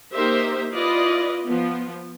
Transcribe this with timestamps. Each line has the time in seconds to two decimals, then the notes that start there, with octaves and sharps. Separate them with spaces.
0.14 A#3 D#4 G4 A#4 C5 E5
0.71 E4 F4 B4 D5 D#5
1.45 F3 B3